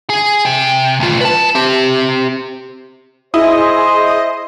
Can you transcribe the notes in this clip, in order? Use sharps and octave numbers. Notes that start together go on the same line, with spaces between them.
G#4
C3
D2 F4
B4 A5
C4 G4
E4 G#4 C5 D#5